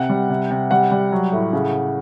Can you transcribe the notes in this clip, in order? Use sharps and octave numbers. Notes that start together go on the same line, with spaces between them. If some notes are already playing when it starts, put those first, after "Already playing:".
Already playing: C3 F#5
G3
C3
C3
G3 F#5
G3
F#3
A2
C#3